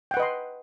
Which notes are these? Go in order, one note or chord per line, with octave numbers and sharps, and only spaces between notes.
B4 D#5 F#5 G5 C6